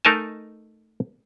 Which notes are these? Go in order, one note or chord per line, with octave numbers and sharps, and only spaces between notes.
A3 D#4 A#4 D#5 G#5 A5